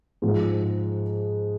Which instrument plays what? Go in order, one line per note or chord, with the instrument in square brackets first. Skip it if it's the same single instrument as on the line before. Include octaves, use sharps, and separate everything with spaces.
[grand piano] G#2 F3 G#3